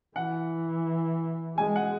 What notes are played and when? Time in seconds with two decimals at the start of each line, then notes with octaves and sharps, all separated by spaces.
0.16 E3 F#5
1.57 G#3 G#5
1.76 F#5